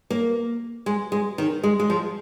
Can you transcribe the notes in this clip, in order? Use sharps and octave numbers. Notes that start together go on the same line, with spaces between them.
A#3
G#3
G#3
D#3
G#3
G#3
F3